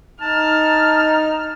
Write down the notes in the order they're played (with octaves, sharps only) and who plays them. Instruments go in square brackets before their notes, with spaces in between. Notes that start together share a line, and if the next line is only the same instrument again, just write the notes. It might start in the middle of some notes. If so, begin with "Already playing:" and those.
[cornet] D#4 [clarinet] A5 [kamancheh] F6